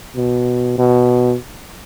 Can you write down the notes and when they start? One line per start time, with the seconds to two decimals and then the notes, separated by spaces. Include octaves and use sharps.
0.16 B2
0.78 B2